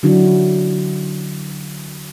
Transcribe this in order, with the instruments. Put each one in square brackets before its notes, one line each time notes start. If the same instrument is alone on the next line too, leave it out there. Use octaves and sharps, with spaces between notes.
[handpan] D3 F#3 D4 E4 F#4